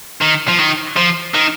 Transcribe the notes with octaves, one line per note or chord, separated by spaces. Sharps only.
D#3
F3
D#3
F3
D#3